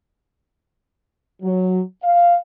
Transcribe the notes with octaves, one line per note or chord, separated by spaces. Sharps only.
F#3
F5